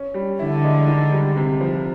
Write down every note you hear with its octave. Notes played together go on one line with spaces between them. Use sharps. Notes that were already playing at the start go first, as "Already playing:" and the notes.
Already playing: C#4
G3
D3 E4
G#3
D#3
G3
C3
F3